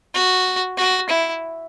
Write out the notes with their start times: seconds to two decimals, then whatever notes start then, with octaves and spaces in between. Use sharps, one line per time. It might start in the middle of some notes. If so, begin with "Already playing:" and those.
0.15 F#4
0.78 F#4
1.09 E4